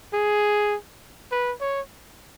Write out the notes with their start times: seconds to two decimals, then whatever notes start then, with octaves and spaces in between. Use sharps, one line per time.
0.14 G#4
1.32 B4
1.61 C#5